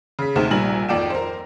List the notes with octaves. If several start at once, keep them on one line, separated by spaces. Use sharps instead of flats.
C#3 B6
D2 C3 D#4 C5 F6 E7
A#1 G3 G#5 A#5 F#7
G#1 F2 D5 G5 E7
A#4 C5